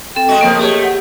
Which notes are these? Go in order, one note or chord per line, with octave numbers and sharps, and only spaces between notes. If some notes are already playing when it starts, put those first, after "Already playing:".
C4 A4 G5
G#3 A3 F#4 D#5
C#3 F3 A#3 A#4
A3 G4 G#4 C#5
F#5